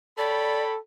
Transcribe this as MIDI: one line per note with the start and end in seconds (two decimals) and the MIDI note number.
0.18 0.77 69
0.18 0.76 73
0.18 0.63 74
0.18 0.76 79
0.18 0.76 83